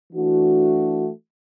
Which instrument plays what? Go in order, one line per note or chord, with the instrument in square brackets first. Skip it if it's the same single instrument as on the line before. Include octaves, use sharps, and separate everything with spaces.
[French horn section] E3 A3 D4 F#4